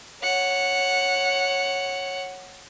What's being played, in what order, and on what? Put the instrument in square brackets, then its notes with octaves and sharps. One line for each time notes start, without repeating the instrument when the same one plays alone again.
[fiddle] C#5 F#5